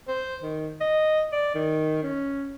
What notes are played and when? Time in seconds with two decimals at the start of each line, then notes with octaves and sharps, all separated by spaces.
0.08 C5
0.43 D#3
0.81 D#5
1.32 D5
1.54 D#3
2.03 C#4